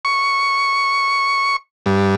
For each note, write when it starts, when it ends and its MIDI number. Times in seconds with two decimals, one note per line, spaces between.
0.05 1.56 85
1.86 2.15 43